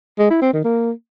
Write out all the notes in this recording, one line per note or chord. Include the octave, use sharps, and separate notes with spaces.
G#3
E4
C4
D#3
A#3